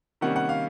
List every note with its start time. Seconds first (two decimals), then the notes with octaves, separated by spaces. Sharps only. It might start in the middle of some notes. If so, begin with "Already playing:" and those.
0.21 C3 D#3 G3 A#3 C#4 F#5
0.36 F#5
0.49 F5